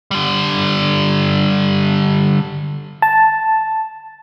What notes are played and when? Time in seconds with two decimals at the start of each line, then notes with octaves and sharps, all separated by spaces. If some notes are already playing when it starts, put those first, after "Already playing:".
0.11 D3 G3
3.02 A5